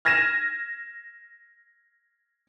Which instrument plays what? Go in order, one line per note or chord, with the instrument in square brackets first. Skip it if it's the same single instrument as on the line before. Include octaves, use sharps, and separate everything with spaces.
[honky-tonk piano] F6 G#6 A#6 D#7 E7